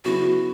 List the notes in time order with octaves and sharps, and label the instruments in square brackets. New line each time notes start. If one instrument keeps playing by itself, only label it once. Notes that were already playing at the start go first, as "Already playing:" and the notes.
[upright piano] C#3 F#3 B3 E4 [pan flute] F#4